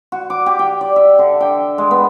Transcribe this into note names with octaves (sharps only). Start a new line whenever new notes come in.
F#4
D6
G4
G5
D5
E5
D3
G5
G#3
B3